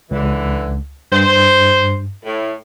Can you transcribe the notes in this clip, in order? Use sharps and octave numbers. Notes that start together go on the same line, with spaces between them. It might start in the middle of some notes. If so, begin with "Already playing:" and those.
C#2 D3 E3
G2 C5
A2